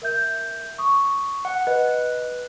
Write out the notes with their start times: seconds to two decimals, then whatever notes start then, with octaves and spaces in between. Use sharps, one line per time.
0.02 A#4 E5 G6
0.78 C#6 D#6
1.45 F#5
1.67 B4 D#5